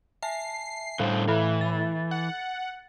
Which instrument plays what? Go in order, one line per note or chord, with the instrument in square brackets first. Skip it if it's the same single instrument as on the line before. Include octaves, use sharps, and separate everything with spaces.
[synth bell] E5 G#5 A5 [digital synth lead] C7
[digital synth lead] A2 [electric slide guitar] D3 G3 C5 [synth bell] F5
[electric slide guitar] E3 [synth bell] A4 E5 B5
[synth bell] A6
[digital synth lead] F#5